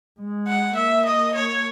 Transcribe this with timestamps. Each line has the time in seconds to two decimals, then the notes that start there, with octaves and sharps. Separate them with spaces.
0.19 G#3
0.48 F#5
0.76 A#3 E5
1.05 D#5
1.34 C#5